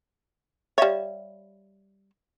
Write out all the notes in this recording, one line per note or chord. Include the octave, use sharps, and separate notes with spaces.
G3 C#5 E5 F5 E7